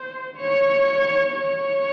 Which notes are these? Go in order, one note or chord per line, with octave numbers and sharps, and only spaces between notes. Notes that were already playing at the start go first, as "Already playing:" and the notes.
Already playing: C5
C#5
C#5